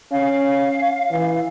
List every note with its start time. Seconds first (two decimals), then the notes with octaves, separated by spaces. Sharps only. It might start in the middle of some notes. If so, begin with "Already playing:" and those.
0.12 C#4 F5
1.11 E3